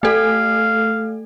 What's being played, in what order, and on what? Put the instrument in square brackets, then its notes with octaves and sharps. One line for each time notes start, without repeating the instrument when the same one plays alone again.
[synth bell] A3 A4 [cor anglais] F5